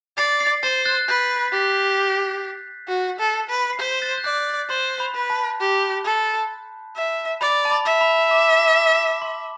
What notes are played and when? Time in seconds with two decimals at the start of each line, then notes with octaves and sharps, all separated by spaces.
0.17 D5 A6 C7
0.40 A6 C7
0.63 C5 A6 C7
0.85 F#6 A6
1.08 B4 G6
1.48 B6
1.53 G4 F#6 A6
2.88 F#4
3.19 A4
3.49 B4
3.73 C7
3.79 C5 G6 B6
4.02 F#6 A6
4.18 G6
4.24 D5 F#6
4.69 C5 C6
5.00 B5
5.15 B4
5.30 A5
5.60 G4
6.05 A4
6.96 E5
7.41 D5 B5
7.65 A5
7.71 B5
7.86 E5
8.01 B5
8.31 D6
9.22 C6